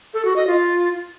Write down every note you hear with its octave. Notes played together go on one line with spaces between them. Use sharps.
A4
F#4
D#5
F4